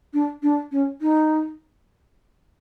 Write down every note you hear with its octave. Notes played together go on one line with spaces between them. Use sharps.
D4
D4
C#4
D#4